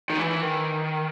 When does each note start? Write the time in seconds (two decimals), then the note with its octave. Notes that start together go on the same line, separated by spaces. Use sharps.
0.10 D#3
0.18 E3
0.42 D#3